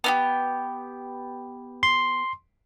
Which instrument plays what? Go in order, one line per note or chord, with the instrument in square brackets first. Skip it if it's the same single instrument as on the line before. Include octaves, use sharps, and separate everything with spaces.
[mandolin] B3 D#4 G4
[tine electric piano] C6